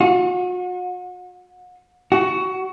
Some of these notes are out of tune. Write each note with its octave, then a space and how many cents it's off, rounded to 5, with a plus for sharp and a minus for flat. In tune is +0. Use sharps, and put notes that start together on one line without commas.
F#4 -40
F#4 +15